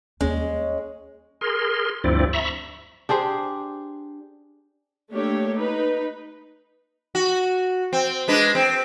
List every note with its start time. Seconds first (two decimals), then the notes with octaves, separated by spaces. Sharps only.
0.21 D#2 G3 G#3 C#4
1.41 G#4 A#4 C6
2.04 D2 G2 F3 C4 E4 D5
2.33 E5 A#5 B5 C#6
3.09 D4 G4 G#4 C5
5.11 A3 A#3 D4 G4 C#5
5.56 D#4 B4
7.15 F#4
7.93 C4
8.28 G#3 D4 B4
8.55 C4